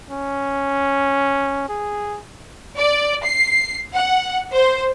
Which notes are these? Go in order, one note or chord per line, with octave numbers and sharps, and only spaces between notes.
C#4
G#4
D5
C7
F#5
C5